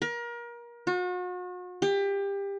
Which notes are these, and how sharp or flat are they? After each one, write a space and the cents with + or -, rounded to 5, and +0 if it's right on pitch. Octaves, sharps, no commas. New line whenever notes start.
A#4 +30
F#4 -40
G4 +25